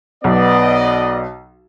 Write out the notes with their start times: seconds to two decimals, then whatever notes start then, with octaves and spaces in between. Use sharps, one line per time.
0.24 B1 B3 D5 D#5